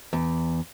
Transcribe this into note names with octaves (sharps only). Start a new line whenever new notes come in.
E2